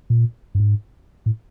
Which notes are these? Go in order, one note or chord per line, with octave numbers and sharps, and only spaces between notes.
A#2
G2
G#2
A2